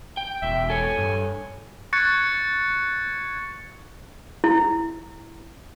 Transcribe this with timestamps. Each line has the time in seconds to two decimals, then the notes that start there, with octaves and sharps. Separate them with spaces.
0.17 G5
0.42 E1 E5
0.70 A4 C#5 G#5
0.98 G2
1.93 C#6 F#6 G#6 A6 C#7
4.44 E4